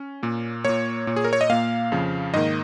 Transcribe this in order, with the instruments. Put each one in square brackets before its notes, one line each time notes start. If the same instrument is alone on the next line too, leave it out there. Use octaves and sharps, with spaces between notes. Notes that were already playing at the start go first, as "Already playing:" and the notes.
Already playing: [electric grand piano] C#4
A#2 A#3
A#2 A#3 C#5
A#2 A#3
G#4
A#4
C#5
D#5
A#2 A#3 F5
F2 C#3 F3
G#2 D#3 A#3 D#5